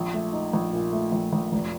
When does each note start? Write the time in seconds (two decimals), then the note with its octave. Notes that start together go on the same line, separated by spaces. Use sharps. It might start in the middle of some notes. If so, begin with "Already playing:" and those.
Already playing: A#1
0.14 A3
0.33 D#4
0.53 A#1
0.73 A#2
0.92 A3
1.12 A#1
1.33 A#1
1.52 F1